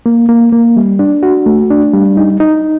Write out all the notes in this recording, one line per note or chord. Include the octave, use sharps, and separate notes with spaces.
A#3
A#3
A#3
G3
D4
F#4
A3
D4
G3
D#4
D#4